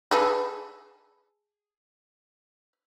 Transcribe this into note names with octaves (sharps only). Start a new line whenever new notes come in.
G#4 A4 B4